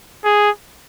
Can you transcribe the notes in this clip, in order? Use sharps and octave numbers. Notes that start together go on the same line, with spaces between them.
G#4